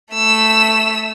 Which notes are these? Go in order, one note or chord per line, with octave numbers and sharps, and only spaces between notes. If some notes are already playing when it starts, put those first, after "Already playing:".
A3 E6